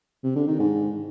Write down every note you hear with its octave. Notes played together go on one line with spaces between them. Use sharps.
C3
D3
D#3
G#2